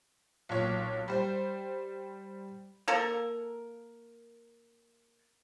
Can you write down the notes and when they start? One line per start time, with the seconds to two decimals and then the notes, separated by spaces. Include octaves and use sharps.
0.49 B1 A#2 C#5
1.08 G3 C5
2.88 A#3 A4 A#4